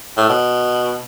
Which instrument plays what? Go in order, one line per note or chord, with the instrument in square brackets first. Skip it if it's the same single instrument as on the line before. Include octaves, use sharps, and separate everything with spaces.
[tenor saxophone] A2
B2